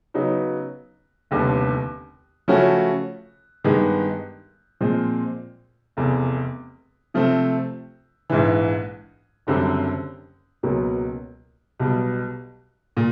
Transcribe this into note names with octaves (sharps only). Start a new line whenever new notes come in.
C#3 F#3 B3 D#4
F1 D#2 D3 G3 B3
C#3 F3 A3 C#4 F#4
G2 D#3 G#3 B3
A#2 F3 G#3 C4
F1 E2 C3
C3 F3 A3 C4
A#1 G#2 E3
F#1 F#2 D3 G3 C4
C#2 B2 F#3 A#3
B1 B2 G3
A#2